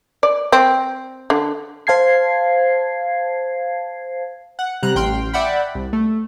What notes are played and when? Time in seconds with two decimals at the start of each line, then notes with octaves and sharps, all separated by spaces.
0.23 D5
0.52 C4
1.30 D3
1.87 C5 F5 A5 G#6 C7
4.59 F#5
4.83 C3 G3 A#5 F#6
4.95 A1 G5 C6 F6
5.33 D5 E5 F#5 G5 B5
5.75 C2
5.93 A3